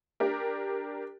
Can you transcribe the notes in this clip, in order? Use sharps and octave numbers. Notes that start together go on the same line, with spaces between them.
D4 G4 A#4